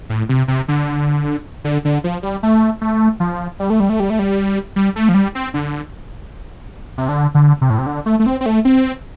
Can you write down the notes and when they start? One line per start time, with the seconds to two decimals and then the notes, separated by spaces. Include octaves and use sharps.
0.10 A2
0.29 C3
0.48 C3
0.68 D3
1.64 D3
1.85 D3
2.04 F3
2.23 G3
2.43 A3
2.81 A3
3.20 F3
3.59 G3
3.70 A3
3.80 G3
3.89 A3
4.00 G3
4.10 A3
4.19 G3
4.76 G3
4.96 A3
5.09 F3
5.14 G3
5.35 C4
5.54 D3
6.98 C3
7.09 D3
7.35 D3
7.61 C3
7.70 A2
7.79 C3
7.86 D3
8.06 A3
8.19 A3
8.26 C4
8.41 C4
8.46 A3
8.65 C4